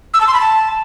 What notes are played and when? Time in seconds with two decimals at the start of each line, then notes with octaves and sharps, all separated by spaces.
0.14 E6
0.20 A5
0.27 C6
0.34 B5
0.41 A5